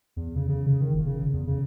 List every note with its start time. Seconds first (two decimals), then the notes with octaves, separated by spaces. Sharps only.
0.16 E2
0.36 C#3
0.49 C#3
0.67 C#3
0.81 D#3
0.94 G1
1.06 C#3
1.33 E2
1.47 C#3